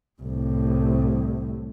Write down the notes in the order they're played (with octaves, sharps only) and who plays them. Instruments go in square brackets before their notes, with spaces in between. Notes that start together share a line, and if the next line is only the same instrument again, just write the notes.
[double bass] C2 A2